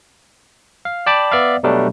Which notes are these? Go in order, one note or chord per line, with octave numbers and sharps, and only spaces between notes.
F5
D5 G5 A5 B5 D6
B3 D5 E5 F5
B2 F#3 G3 A3 D4